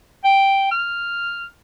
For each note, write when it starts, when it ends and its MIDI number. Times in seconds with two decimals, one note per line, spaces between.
0.24 0.70 79
0.71 1.48 89